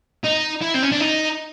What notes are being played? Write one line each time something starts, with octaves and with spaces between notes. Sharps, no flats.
D#4
E4
C4
C#4
D4
D#4